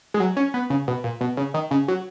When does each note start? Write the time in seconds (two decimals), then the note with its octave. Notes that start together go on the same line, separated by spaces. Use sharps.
0.14 G#3
0.20 F#3
0.37 C#4
0.54 B3
0.70 C#3
0.88 B2
1.04 A#2
1.21 B2
1.37 C#3
1.54 D#3
1.71 C#3
1.88 F#3